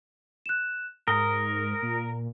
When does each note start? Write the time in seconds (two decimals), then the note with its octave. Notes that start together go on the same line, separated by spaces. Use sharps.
0.46 F#6 E7
1.08 G#2 A#4 D#6 G7
1.83 A#2